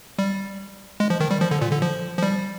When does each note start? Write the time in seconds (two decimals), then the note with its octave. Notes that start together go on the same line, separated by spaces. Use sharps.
0.19 G3
1.00 G#3
1.10 F3
1.20 D#3
1.31 G3
1.41 F3
1.51 D3
1.61 A#2
1.72 D3
1.82 F3
2.19 F3
2.23 G3